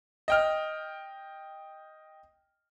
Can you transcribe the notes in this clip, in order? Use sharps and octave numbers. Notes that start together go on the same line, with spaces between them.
D#5 G5 F6